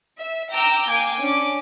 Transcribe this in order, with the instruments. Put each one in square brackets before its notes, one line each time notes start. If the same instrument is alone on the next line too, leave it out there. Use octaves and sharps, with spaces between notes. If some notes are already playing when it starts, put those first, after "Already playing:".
[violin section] E5
G5 A#5 D6 E6 G6
A#3 G5 G#5 D6
C#4 D4 D6